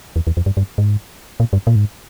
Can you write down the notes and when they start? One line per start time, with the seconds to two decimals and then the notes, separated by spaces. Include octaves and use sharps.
0.16 E2
0.27 E2
0.37 F2
0.46 G2
0.57 G2
0.78 G#2
1.40 A#2
1.53 G2
1.67 A#2
1.76 G#2